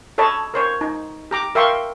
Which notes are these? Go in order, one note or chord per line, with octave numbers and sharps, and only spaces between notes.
A4 C#5 D#5 A5 B5
A#4 C5 C#5
D#4
G4 A#5 D6
A#4 E5 F5 G5 C6 C#6